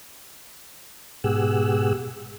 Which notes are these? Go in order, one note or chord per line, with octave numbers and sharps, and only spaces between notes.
G#2 B2 G4 G#4 F#5 E6